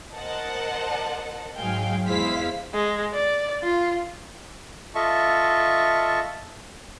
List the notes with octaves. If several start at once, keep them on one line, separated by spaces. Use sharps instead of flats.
A#4 C5 D#5 F#5 A5
G#2 F#3 G#3 F5 G5 G#5
E2 G#3 E4 C5 F5 B6
G#3
D5
F4
F4 A4 D#5 E5 A5 C#6